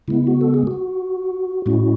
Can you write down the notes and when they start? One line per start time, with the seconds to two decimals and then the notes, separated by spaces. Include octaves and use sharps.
0.08 C#3 G#3 B3 E4
0.27 F#4
0.41 A4
0.54 G#4
0.67 F#4
1.66 A2 G#3 C#4 E4 F#4